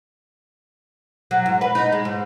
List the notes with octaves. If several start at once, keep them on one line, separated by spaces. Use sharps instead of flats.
F#3
G#2
B4
D#4
G#3
G#2